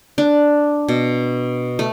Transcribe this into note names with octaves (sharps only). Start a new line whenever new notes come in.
D4
B2
A3